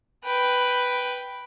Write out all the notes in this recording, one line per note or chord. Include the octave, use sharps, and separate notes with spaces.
B4 G5